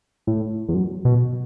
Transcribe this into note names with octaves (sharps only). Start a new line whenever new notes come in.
A2
E2
F#2
B2